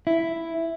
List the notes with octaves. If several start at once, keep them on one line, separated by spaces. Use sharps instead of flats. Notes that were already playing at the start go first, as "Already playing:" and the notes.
E4